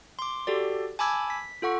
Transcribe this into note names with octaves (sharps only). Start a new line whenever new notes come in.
C6 D6
F#4 G4 A4 D5
G#5 A5 B5 D6 E6 G#6
B6
F4 A4 F#5 C#6